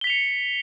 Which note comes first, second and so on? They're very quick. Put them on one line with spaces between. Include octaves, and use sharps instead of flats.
G7 B6 F7 C#7